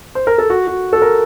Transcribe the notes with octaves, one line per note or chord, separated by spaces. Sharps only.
C5
A#4
A4
F#4
F#4
A4
A#4